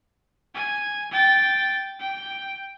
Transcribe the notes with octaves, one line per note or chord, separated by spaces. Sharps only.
G#5
G5 A6
G5